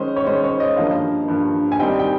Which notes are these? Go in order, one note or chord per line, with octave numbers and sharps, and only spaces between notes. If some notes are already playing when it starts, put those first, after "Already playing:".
Already playing: D#3 G#3 C#4 C5
C#5
D#3 G#3 C#4 C5
C#5
D#5
G2 F3 A#3 F5
G2 F3 A#3
G#5
D#3 G3 C4 D#4 G5
G5